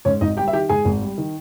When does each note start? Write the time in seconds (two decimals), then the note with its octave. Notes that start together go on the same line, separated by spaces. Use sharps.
0.05 G#2 C#4 C#5
0.21 G#1 D#4 D#5
0.37 G3 G4 G5
0.48 E5
0.53 D#3 G4 G5
0.69 G#2 G#4 G#5
0.85 G#1
1.02 G3
1.18 D#3